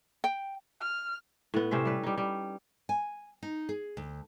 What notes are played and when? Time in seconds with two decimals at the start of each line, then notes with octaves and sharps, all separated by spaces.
0.24 G5
0.81 F6
1.54 A2 B3
1.71 C3 C#4 C5 E5
1.85 G3 B4
2.03 G3 D#4
2.18 G3
2.89 G#5
3.43 D#4
3.69 G#4
3.97 D2